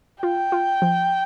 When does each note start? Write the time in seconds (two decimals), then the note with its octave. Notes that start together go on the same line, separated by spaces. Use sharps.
0.23 F4 G5
0.52 F4
0.82 F3